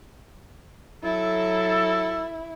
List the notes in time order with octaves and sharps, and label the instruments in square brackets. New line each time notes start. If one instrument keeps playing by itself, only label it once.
[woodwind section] F#3 A4 [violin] E4